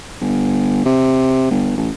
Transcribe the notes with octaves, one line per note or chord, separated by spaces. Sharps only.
G1
C3
G1
A1